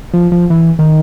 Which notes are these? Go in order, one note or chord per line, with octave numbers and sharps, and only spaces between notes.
F3
F3
E3
D#3